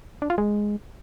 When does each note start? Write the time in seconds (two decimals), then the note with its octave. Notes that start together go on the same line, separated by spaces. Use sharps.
0.22 D4
0.30 F4
0.38 G#3